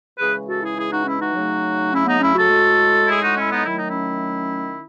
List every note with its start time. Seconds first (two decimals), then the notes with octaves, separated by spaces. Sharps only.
0.19 C#3 E3 G#3 G#4 B4
0.48 F#4 A4
0.62 E4 G#4
0.77 E4 G#4
0.91 D#4 F#4
1.06 C#4 E4
1.20 D#4 F#4
1.34 C#3 F#3 A3
1.92 C#4 E4
2.06 B3 D#4
2.20 C#4 E4
2.35 F#4 A4
2.50 A2 G#3
3.08 E4 G#4
3.22 D#4 F#4
3.37 C#4 E4
3.51 B3 D#4
3.65 D#3 F#3 A3 E4
3.76 D#4
3.87 C#4 E4